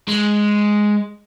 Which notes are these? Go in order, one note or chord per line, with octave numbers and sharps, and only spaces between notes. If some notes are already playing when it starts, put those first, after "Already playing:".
G#3